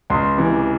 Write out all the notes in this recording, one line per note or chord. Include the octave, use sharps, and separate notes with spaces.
C#2 C6
C3 E3